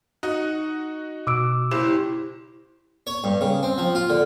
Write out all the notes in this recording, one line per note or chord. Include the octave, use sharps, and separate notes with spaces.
D#4 F#4
B2 D6 E6 D7
F#1 E4 G4 C5 E7
C#5
G2
C#3
C4
F3
F4
D3